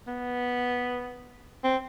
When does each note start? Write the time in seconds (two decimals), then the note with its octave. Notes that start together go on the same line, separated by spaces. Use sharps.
0.07 B3
1.64 C4